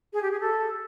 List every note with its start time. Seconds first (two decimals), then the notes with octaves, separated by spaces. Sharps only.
0.13 G#4
0.22 G4
0.31 G#4
0.40 A4